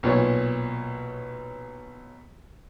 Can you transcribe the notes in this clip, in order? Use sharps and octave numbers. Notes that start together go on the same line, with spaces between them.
B1 A#2 C#5